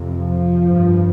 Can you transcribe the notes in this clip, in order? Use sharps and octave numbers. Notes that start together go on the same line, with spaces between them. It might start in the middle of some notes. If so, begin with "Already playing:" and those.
Already playing: F2 C3
F3
G2